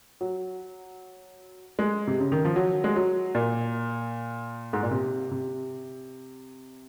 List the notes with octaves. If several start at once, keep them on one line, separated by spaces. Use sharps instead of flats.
F#3
G#3
C3
C#3
D#3
F3
F#3
G#3
F#3
A#2
G#2
A#2
C3
C3